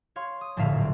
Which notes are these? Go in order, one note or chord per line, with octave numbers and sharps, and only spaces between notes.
C#5 F5 C6
D#6
F1 A#1 A2 D3 E5 F5
F#1 C4